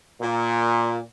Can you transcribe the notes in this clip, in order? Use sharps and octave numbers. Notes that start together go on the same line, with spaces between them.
A#2